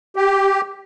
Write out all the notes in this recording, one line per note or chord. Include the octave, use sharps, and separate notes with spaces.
G4